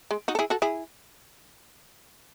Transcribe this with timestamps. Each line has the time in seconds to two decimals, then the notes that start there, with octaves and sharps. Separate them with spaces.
0.11 G#3
0.28 D#4 F#4
0.35 A4
0.39 E4 G#4
0.50 F#4 A4
0.62 E4 G#4